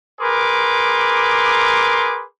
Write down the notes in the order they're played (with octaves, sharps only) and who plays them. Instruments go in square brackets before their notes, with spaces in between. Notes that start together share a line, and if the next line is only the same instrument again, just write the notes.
[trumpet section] G#4 A#4 B4 C6 D6